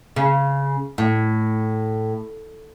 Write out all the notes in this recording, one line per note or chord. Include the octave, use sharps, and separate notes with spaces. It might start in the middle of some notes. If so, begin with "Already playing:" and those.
C#3
A2